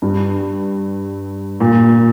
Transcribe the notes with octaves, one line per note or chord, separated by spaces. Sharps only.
G2
A#2